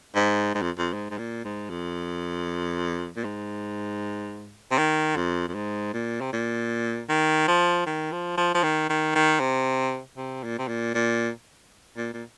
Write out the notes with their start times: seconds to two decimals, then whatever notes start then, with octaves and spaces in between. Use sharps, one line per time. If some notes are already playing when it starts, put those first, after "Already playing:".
0.15 G#2
0.55 G#2
0.62 F2
0.78 F2
0.93 G#2
1.11 G#2
1.18 A#2
1.44 G#2
1.70 F2
3.16 A#2
3.24 G#2
4.71 C3
4.78 D#3
5.16 F2
5.48 F2
5.55 G#2
5.93 A#2
6.21 C3
6.33 A#2
7.09 D#3
7.48 F3
7.86 D#3
8.12 F3
8.37 F3
8.55 F3
8.63 D#3
8.89 D#3
9.15 D#3
9.40 C3
10.17 C3
10.44 A#2
10.58 C3
10.68 A#2
10.95 A#2
11.97 A#2
12.14 A#2